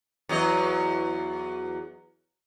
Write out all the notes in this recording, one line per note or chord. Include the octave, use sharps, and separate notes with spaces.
E2 F#3 D#5